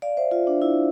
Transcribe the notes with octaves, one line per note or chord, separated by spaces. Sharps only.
D5 F5
C5 E5
F4
D4
E4